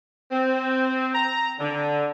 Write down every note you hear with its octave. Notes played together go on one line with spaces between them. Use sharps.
C4
A#5
D3